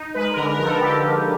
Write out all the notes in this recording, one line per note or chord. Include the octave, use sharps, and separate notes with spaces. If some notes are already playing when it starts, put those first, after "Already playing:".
Already playing: D#4
G#3 B4
D3 A#4
A#4
F3 A#4
A4
D3 G4
F3